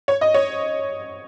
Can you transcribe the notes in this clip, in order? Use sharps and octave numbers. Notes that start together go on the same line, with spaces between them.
C#5
D#5
C#5